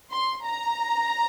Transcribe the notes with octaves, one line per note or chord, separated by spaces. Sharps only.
C6
A#5